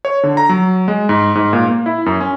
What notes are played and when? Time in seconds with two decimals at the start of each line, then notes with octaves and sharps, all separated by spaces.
0.05 C#5
0.23 D3
0.37 A#5
0.49 F#3
0.88 G#3
1.09 G#2
1.35 G#2
1.53 A#2
1.68 A#3
1.86 E4
2.06 F#2
2.20 C#4